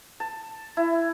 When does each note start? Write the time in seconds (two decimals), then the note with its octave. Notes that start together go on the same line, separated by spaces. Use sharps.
0.20 A5
0.77 E4